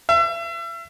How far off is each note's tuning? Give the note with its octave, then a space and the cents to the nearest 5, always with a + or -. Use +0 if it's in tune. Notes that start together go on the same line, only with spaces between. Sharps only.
E5 +35